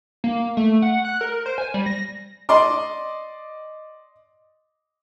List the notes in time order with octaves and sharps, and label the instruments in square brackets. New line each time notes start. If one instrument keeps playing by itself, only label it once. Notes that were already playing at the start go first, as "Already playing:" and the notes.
[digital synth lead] A#3
A3
F#5
F#6
A#4
C5
G#5
G3
A#6
[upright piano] D5 D#5 C6 D6